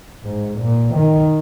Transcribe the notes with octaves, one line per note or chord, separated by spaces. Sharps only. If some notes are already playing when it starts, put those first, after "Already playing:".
G#2
A#2
D#3